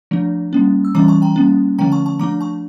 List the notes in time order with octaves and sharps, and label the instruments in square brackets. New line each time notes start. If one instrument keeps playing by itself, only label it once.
[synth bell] F3 A3 D4
G3 A#3 C#4
E6
E3 G3 C#4 A#5 D6
A5 C#6
G5 A#5
G3 A#3 C#4
D3 F3 A3 C#4 G5 A#5
A5 C#6
A5 C#6
F3 A3 D4 A#5 D6
A5 C#6